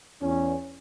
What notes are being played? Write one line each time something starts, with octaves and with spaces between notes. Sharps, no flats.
E2 C#4